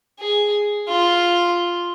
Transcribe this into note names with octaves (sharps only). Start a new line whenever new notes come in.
G#4
F4